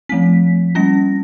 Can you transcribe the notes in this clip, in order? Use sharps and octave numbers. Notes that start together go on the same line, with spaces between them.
F3 A3 C4 B6
G3 A#3 C#4 A#6